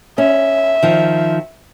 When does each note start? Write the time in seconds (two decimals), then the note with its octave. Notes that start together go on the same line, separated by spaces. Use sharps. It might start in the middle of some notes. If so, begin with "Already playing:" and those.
0.18 C#4 E5
0.83 D#3 F3